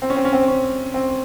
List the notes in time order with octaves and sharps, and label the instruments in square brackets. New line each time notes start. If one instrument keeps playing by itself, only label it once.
[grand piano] C4
C#4
C4
C#4
C4
C#4
C4